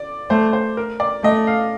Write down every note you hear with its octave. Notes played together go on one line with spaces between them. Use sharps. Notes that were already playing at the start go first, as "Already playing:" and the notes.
Already playing: D5
A3 C5
C5
A#4
D5
A3 D#5
F5